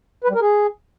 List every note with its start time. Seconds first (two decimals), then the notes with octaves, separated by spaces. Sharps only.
0.24 B4
0.30 G3
0.35 A#4
0.41 G#4